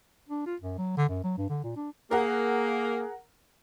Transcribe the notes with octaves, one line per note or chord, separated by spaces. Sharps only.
D4
F4
F#2
F#3
D3
F#2
F#3
G2
D3
A#2
D4
A#3 G#4 A#4 F#5